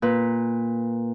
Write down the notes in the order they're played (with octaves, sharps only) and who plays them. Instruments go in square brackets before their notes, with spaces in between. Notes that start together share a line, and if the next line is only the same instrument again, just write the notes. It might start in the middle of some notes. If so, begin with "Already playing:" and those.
[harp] A#2 B4